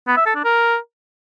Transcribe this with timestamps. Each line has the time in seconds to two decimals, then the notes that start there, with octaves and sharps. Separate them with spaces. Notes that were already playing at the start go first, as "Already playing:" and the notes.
0.07 B3
0.17 E5
0.26 A4
0.35 D4
0.44 A#4